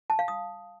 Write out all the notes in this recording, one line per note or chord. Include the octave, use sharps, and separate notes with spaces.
A5
F5
D#6